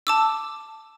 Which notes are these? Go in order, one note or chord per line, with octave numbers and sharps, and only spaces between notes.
A5 D6 E6